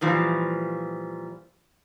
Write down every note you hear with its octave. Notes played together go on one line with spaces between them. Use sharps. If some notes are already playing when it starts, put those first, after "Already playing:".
A#2 E3 F3 G3